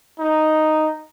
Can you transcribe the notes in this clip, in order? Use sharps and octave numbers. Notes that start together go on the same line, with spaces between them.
D#4